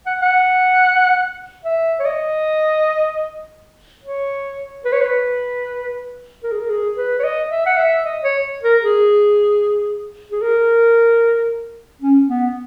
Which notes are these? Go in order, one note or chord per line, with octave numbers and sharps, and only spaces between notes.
F#5
F#5
E5
C#5
D#5
C#5
B4
C#5
B4
A#4
G#4
A#4
G#4
B4
C#5
D#5
E5
F#5
E5
D#5
C#5
A#4
G#4
G#4
A#4
C#4
B3